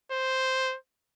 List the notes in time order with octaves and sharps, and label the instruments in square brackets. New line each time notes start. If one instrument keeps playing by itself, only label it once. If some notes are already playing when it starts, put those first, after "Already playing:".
[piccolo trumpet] C5